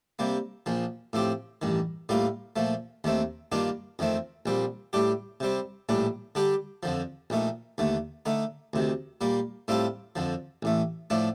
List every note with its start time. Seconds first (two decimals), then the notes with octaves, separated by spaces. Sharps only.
0.19 C3 G3 A#3
0.66 A#1 A#2 F3
1.13 A2 F3 C4 G4
1.62 A1 G2 D#3
2.09 A2 G3 A#3 F4
2.56 A#2 F3 A3
3.04 D#2 D#3 A3 C4
3.52 G2 D#3 A#3 D4 F4
3.99 F2 D#3 A3 C4
4.46 A#1 A#2 G3 C4
4.93 A2 G3 D4 G4
5.40 C3 G3 C4
5.89 A#1 A2 G3 D4
6.35 D3 G3 D4 G4
6.83 F2 D3 F3
7.30 A#1 A#2 A3 D#4
7.78 D#2 D3 A3
8.26 D3 A3 D#4
8.73 D2 C3 D#3
9.21 A#2 G3 A#3
9.68 A2 G3 C4 F4 A4
10.16 F2 D3 F3
10.63 A1 A2 A3
11.10 A2 F3 A3 D4